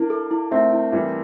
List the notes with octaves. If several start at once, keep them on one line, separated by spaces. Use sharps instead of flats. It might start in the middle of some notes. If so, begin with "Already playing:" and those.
Already playing: A#3 D4 E4
A4
E4
A3 C4 E5
E4
E3 G3 A4